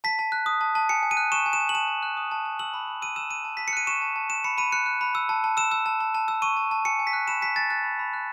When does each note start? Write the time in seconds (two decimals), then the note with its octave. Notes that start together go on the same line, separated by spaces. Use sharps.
0.04 A5 B6
0.19 A5
0.32 F#6
0.46 D#6
0.61 A5
0.75 A5
0.89 G#5 C#7
1.03 G#5
1.11 D#7
1.17 F#6
1.32 C#6 E7
1.46 G#5
1.53 E7
1.60 G#5
1.69 F#7
1.74 A5 E7
1.88 A5
2.03 F#6
2.17 D#6
2.31 A5
2.46 A5
2.59 E6 F#7
2.74 B5
2.88 B5
3.02 E6 D#7
3.16 E6 E7
3.31 B5 D#7
3.45 A5
3.57 A5 B6
3.68 C#7
3.73 F#6 D#7
3.87 C#6 E7
4.02 A5
4.16 A5
4.30 F#6 E7
4.44 B5 C#7
4.58 B5 D#7
4.72 F#6 C#7
4.86 F#6
5.01 B5
5.15 E6
5.29 A5
5.44 A5
5.57 E6 E7
5.71 E6
5.86 A5
6.00 A5
6.15 A5
6.28 E6
6.42 C#6 D#7
6.57 A5
6.71 A5
6.85 G#5 C#7
6.99 G#5
7.07 B6
7.13 F#6
7.28 B5 E7
7.41 G#5 B6
7.56 G#5 A6
7.70 F#6 A6
7.84 B5
7.99 B5
8.13 F#6